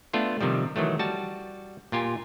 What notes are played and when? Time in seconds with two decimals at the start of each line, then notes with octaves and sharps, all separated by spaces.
0.13 A3 B3 D4 F4
0.41 C3 D#3 F3 G3
0.76 D#3 E3 F#3 A3
0.99 G3 F#4 A5
1.92 A#2 F4 G4 G#5